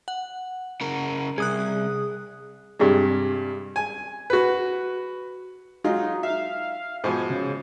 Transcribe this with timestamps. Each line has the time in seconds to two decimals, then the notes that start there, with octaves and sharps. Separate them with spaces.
0.08 F#5
0.81 C#3 A#4
1.38 C2 G#4 D#6 F#6
2.79 G2 C3 G3 G#3
3.76 G#5
4.30 F#4 B4
5.84 F#3 G#3 D#4 F4
6.23 E5 F5
7.04 G#2 B2 F3 G#5
7.30 C#3